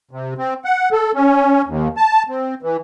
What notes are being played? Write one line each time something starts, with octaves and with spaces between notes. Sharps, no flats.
C3
C4
F#5
A4
C#4
D#2
A5
C4
E3